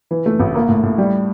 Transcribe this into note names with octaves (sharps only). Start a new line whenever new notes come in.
E3
A3
A1
A#3
A2
A2
G3